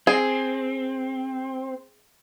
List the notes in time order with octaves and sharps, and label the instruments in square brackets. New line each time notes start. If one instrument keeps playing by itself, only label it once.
[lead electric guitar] C4 [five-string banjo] G#4